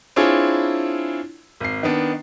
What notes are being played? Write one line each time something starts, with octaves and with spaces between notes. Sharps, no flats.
C4 D4 E4 F4 G#4 C#5
G#1 C7
D#3 B3 D4